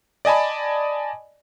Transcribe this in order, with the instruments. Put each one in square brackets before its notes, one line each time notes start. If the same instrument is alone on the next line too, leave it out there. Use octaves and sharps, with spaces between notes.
[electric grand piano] D5 D#5 G#5 A5 B5